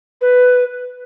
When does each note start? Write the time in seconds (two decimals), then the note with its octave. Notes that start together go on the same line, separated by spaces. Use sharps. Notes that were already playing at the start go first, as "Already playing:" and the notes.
0.21 B4